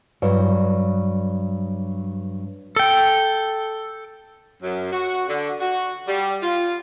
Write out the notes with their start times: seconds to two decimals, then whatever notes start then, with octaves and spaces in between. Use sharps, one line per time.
0.22 G2 F#3
2.76 A4 G5
4.62 F#2
4.92 F#4
5.28 D3
5.60 F#4
6.07 G3
6.42 F4